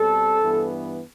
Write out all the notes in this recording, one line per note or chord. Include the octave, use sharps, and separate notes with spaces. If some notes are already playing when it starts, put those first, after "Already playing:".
Already playing: B2 G3 C4 A4
G2 E3 B3